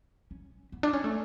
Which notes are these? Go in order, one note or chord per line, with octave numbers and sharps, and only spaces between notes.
C#4
B3
D4
C#4
A3